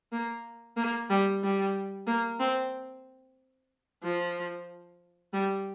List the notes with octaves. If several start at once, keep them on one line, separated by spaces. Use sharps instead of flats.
A#3
A#3
G3
G3
A#3
C4
F3
G3